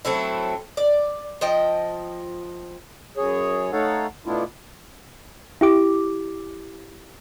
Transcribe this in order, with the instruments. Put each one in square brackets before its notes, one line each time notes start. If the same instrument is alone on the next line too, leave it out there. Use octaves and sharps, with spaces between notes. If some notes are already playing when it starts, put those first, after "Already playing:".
[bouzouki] F#3 A3 C4 E4
D5
F3 D#5 G5
[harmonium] F#2 G#4 C#5
A3 D#4 A4 C#5 F5 F#5
B2 A3 B3 D4 E4 F4
[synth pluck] E4 G4 D6